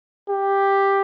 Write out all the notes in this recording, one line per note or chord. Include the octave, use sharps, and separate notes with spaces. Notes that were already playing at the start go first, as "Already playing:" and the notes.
G4